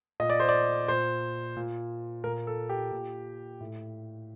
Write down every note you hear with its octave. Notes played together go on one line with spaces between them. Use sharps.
A#2 D#5
D5
C5
D5
A#2 C5
A#2
A#2 A#4
A4
G4
A#2
A2